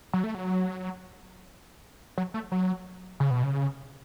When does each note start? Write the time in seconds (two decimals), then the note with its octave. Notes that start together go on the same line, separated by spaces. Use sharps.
0.13 F#3
0.24 A3
0.35 F#3
2.18 F#3
2.34 A3
2.52 F#3
3.20 C#3
3.31 B2
3.43 C#3